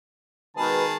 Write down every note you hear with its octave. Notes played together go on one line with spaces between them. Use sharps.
B2 D#3 G#3 G#4 B4 A5